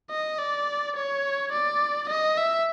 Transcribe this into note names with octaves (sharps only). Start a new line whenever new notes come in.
D#5
D5
C#5
D5
D#5
E5